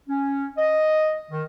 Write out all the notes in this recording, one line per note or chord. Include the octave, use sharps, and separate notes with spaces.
C#4
D#5
D#3